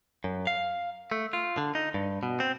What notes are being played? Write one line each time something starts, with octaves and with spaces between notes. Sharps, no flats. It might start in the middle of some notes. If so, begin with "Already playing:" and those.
F#2
F5
A3
F4
D3
D#4
G2
B2
C4